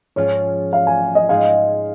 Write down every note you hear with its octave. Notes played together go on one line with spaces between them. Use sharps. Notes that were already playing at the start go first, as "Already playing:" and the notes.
G#2 F3 C#4 F4 G#4 C#5
F5
G#5
D#5
G#2 G#3 D#4 G#4 F5